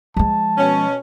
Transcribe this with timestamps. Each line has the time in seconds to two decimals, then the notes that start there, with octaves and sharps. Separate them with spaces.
0.17 F3 G#3 A5
0.58 B2 C#4